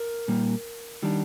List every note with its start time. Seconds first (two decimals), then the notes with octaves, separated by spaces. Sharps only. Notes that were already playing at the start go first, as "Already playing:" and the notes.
Already playing: A#4
0.28 A#2 G3 A#3
1.02 D#3 G3 D4